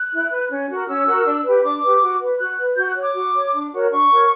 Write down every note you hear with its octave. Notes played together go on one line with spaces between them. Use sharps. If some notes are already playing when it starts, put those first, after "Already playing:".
Already playing: F#6
E4
B4
C#4
F#4 A#4
C#4 E6
F#4 A#4
D4
G4 B4
D4 D6
G4 B4
F#4
B4
F#4 F#6
B4
F#4 G6
F#6
C#5
D6
F#4
C#5
D4
F#4 A#4 C#5
D4 C#6
F#4 A#4 C#5